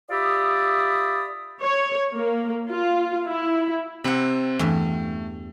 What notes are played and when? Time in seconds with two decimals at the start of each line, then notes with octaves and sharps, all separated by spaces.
0.10 F4 G4 D5 E5 B5 D#6
1.62 C#5
2.15 A#3
2.70 F4
3.26 E4
4.04 C3 C4 F#5 B5
4.59 E2 G2 A3 E5